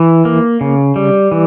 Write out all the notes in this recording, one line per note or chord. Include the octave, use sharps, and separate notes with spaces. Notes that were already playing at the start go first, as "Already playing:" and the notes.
Already playing: E3
A#3
C#3
G3
E3